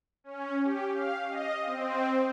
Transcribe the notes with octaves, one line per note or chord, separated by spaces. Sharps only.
C#4
G4
F5
D#5
C4